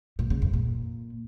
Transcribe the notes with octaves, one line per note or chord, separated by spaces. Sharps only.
A#2
C#3
F2
A#2